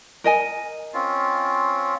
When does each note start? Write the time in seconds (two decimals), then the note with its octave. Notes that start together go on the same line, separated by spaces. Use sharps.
0.24 A#4 D#5 G#5
0.94 C4 C#4 F4